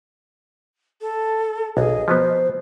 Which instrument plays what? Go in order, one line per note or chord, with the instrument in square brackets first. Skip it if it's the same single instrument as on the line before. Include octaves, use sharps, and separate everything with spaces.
[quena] A4
[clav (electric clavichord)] B1 [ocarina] G#4 [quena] D#5
[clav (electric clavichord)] F3 F#3 B3 [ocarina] C5